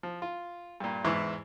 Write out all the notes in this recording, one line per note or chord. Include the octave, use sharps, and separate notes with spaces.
F3
F4
G2 A#2
E2 G#2 E3 E4 C#6 D6